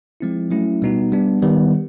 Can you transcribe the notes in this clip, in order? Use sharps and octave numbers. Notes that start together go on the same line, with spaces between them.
F3 G#3 C4 E4
F#3 A3 C#4 E4
B2 G3 B3 D#4 F#4
G3 B3 D4
D#3 G3 B3